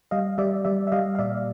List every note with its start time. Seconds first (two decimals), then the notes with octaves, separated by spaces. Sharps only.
0.11 G3 D#5 F5
0.38 G3 D5 E5
0.65 G3 D5 E5
0.87 E5
0.92 G3 D#5 F5
1.15 F5
1.19 A#2 D5 E5